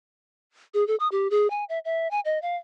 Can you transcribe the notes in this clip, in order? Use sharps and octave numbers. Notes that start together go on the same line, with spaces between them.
G#4
A4
D#6
G4
G#4
G#5
E5
E5
G#5
D#5
F5